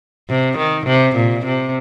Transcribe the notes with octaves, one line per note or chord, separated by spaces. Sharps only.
C3
D#3
C3
A#2
C3